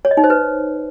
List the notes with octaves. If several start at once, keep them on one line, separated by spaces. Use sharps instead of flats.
C#5
D#5
D#4
C5
B4